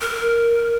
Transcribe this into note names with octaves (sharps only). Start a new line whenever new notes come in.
A#4